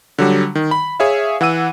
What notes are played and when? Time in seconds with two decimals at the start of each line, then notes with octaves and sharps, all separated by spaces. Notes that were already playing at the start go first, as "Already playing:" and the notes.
0.18 D3 F#3 G3
0.55 D#3
0.71 B5
1.00 G#4 C#5 E5 F5
1.41 E3 F#5 E6 D#7